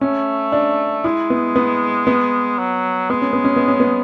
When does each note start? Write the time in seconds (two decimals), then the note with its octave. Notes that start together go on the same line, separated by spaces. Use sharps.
0.01 A3 C#4
0.52 D4
1.04 G#3 E4
1.30 B3
1.56 B3
2.07 B3
2.58 F#3
3.10 G#3 B3
3.22 C#4
3.33 B3
3.44 C#4
3.56 B3
3.68 C#4
3.80 B3